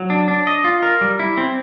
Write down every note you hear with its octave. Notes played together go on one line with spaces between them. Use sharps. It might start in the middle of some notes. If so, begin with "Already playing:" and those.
Already playing: F#3
D4
D4
D#5
F4
A#4
G3
E4
C4